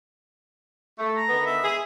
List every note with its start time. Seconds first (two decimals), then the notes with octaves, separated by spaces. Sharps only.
0.99 A3
1.17 A#5
1.29 D3 D#3 B3
1.46 E5
1.64 G#4